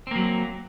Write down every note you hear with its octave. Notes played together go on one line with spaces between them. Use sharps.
F#3 A#3 C4